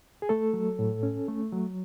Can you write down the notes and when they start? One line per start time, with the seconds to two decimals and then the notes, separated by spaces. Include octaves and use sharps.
0.22 G#4
0.29 A3 A4
0.54 F#3
0.79 A2
1.03 C#4
1.28 A3
1.53 F#3